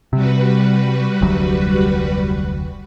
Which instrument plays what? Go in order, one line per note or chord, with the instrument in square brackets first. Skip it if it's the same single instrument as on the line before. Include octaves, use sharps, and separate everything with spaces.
[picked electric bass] C3 [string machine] G3 F#4 B4
[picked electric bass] F1 D2 F#3